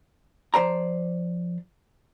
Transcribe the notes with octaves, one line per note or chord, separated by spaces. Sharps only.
F3 C5 D5 A#5